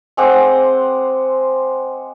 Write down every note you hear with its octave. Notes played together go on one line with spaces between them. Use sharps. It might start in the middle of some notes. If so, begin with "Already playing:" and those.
G#3 C4 F#5 D6